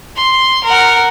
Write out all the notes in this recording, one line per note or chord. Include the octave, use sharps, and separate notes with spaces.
C6
A#4 F#5